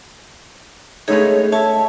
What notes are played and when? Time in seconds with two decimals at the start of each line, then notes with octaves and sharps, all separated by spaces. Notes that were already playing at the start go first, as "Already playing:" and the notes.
1.08 G#3 A3 B3 C#4 D#4 G#4 C#5
1.52 C#5 E5 A5